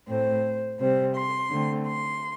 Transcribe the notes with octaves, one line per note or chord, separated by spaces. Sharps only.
A2 A3 C4 C5
C3 G3 C4 C5
C6
D3 A3 C4
C6